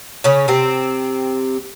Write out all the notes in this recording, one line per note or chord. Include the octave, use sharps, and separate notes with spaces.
C#3 C#4
C3 C4